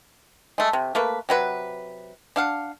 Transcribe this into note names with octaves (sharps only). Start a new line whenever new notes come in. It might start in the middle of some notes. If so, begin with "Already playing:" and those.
G#3 A3
C3
A3 A#3 B4
C3 F#3 B4
D4 F5 F#5